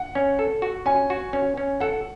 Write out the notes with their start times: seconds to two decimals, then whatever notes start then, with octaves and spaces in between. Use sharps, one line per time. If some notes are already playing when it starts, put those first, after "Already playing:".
Already playing: F#5
0.15 C#4
0.39 A4
0.62 F#4
0.86 C#4 G#5
1.10 F#4
1.33 C#4
1.57 C#4
1.80 A4 F#5